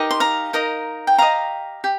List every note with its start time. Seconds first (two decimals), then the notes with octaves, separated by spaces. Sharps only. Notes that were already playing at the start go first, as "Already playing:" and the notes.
Already playing: D#4 G4 A#4 D#5
0.11 C6
0.20 F5 A#5
0.53 D#4 A#4 D#5
1.07 G5
1.18 G4 D#5 F5 A#5
1.84 G4